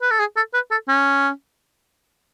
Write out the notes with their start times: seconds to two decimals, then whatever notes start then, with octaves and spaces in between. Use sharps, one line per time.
0.02 B4
0.11 A4
0.20 G#4
0.36 A4
0.54 B4
0.71 A4
0.88 C#4